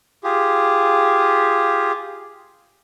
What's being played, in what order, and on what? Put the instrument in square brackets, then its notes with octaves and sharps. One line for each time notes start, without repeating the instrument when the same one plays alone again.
[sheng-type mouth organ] F4 G4 G#4